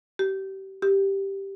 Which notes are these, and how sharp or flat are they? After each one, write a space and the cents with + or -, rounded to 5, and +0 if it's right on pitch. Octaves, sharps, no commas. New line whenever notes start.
G4 -30
G4 +0